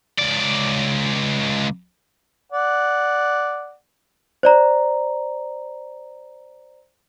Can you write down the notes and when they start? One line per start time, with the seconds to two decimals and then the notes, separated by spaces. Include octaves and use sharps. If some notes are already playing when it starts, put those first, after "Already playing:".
0.18 C#2 D5
2.53 D5 F#5
4.43 C5 D5 A#5